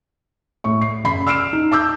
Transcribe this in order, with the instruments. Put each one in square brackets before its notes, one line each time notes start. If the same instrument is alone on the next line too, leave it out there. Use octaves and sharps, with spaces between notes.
[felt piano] A2 C#6
C7
F#1 B5 C7
E6 F6 C7 D7 E7
D#4
A5 D6 E6 G6